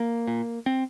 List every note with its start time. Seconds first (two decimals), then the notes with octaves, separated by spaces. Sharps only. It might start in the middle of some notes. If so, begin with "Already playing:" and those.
Already playing: A#3
0.28 A#2
0.66 C4